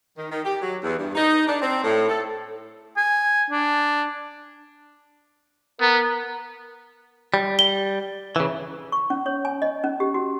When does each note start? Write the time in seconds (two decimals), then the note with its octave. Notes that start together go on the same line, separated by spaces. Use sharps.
0.18 D#3
0.31 D#3
0.45 G4
0.62 F#3
0.83 E2
0.98 G2
1.15 D#4
1.47 D4
1.62 C4
1.84 A2
2.09 A4
2.97 G#5
3.51 D4
5.81 B3 A#4
7.34 G3
7.59 G7
8.36 C#3 E3
8.92 C#6
9.10 C#4
9.26 C#5
9.45 G#5
9.62 D#5
9.84 C#4
10.00 G4
10.14 F#4